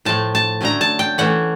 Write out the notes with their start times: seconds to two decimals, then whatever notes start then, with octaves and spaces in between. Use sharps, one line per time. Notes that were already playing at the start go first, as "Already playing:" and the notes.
0.05 A2 F3 A3 A5
0.35 A5
0.61 D3 F#3 A3 C#4 A#5
0.81 A5
0.99 G5
1.18 E3 A3 C#4 F#5